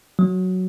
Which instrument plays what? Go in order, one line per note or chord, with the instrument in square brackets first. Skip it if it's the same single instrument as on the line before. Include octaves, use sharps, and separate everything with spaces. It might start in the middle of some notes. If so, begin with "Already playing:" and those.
[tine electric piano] F#3